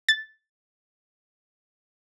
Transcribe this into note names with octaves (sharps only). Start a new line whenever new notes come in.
A6